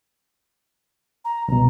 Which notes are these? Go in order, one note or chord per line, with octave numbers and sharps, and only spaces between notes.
A#5
C2 B2 A#5